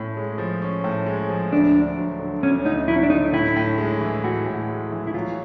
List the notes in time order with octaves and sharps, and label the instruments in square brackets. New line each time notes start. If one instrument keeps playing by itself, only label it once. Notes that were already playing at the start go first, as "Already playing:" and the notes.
Already playing: [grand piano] A2 C#4
G#3
F3
C#4
A2
G#3
F3
[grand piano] D2 [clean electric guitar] D4
[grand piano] D2
F#3
D3
[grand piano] D2 [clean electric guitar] C#4
[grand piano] D2 [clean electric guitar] D#4
[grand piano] F#3 [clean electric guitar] E4
[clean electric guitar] C#4
D4
[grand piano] D3 [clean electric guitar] D#4
[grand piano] A2 [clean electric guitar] E4
[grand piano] A2
G#3
E3
[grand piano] A2 [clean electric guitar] F#4
[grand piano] A2
G#3
E3
[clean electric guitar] E4
[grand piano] F#3 [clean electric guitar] F4